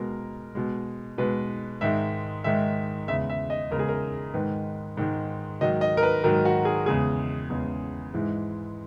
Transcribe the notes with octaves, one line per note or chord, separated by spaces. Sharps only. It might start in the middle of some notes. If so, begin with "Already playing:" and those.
Already playing: B2 G#3 A#4
B2 G#3
B2 G#3 B4
G#2 D#3 G#3 E5
G#2 D#3 G#3 E5
E2 C#3 G#3 E5
E5
D#5
E2 C#3 G#3 A#4
G#4
A#4
G#2 D#3 G#3 B4
G#2 D#3 G#3
G#2 D#3 F#3 D#5
D#5
A#4
B4
G#2 D#3 F#3 A#4
F#4
G#4
E2 C#3 G#3 G#4
E2 C#3 G#3
G#2 E3 G#3